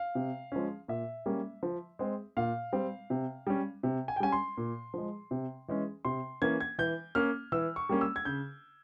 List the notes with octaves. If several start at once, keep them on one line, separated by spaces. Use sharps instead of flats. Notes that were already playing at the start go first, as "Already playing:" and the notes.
Already playing: F5
C3
F3 G#3 C#4
A#2 E5
G3 A#3 C#4
F3
G#3 C4
A#2 F5
G3 C4
C3
G3 C#4
C3
G#5
G5
G3 C#4 G#5
C6
A#2
F3 G#3
C3
E3 G#3 C#4
C3 C6
E3 A#3 C#4 G#6
G#6
E3 G6
A#3 C#4 F6
E3 E6
C#6
G3 A#3 C#4
E6
G#6
C#3 G6